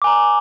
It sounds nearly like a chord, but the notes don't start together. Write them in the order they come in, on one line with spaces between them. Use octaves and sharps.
D6 G#5 A#5